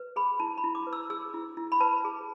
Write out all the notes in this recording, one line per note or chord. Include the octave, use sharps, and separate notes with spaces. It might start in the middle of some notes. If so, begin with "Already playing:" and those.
Already playing: B4
G#4 B5
E4 A5
B5
E4
D6
B4
E6
G#4 E6
E4
E4
B5
B4 A5
G#4